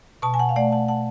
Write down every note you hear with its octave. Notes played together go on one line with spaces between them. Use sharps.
B2 A5 C#6
G#5
F#5 A5
F5
A3 D5 F#5
F#5 A5
F#5 A5